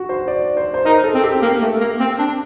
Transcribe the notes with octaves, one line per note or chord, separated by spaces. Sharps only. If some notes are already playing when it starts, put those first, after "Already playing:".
Already playing: F#4
C5
D5
C5
C5
D#4 A#4
A4
C4
G4
A#3 G4
A3
A#3
C4
D4